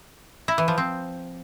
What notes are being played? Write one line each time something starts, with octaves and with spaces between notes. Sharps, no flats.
E4
E3
F3
C4